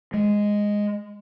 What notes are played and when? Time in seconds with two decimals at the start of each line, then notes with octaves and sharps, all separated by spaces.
0.14 G#3